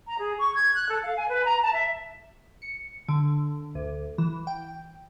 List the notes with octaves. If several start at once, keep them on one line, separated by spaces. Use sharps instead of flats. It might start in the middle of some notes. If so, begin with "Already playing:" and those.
A#5
G#4
C#6
G#6
F#6
A4
F5
G#5
B4
A#5
A5
E5
C#7
D3
D2
E3
G5